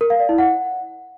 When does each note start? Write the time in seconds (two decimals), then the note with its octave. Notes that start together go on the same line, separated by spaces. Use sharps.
0.01 A#4
0.10 F5
0.20 D5
0.29 E4
0.38 F#5